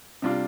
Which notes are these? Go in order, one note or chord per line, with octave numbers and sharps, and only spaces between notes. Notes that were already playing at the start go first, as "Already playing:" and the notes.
C3 G3 D4 F4